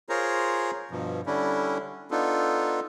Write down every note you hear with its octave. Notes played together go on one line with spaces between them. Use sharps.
F4 G#4 A#4 C5 C#5 A#5
G2 B2 F3
D3 G3 C#4 D4 E4
B3 D4 D#4 F4 A4